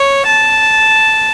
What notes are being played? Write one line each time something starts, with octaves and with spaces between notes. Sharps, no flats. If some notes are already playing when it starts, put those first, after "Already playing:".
Already playing: C#5
A5